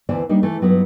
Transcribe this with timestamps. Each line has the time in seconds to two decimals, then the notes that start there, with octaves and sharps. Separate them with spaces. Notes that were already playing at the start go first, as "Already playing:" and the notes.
0.09 D2 E3 B3 E4 C5 D5
0.29 G3 A#3 D4 D#4
0.43 E3 A3 E4
0.61 G2 F#3 B3 D#4